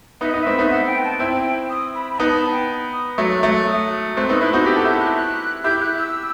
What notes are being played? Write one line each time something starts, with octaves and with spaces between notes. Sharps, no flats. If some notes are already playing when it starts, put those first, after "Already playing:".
B3 D#4 E5
B3 D#4 D#5
A3 C4 E5
B3 D#4
F#5
G5
A5
C4 E4 G5
D#6
B5
B5
B3 D#4 A5
A5
G5
D#6
F#3 A3 E6
F#6
F#3 A3
E6
E6
D#6
A3 C4 F#6
B3 D#4 E6
C4 E4 F#6
D#4 F#4 G6
G4
A4
E4 G4 G6
F#6
F#6
E4 G4 G6
F#6
E6